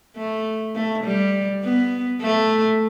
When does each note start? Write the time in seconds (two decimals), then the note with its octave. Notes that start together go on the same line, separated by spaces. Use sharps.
0.16 A3
0.75 A3
1.04 G3
1.63 B3
2.22 A3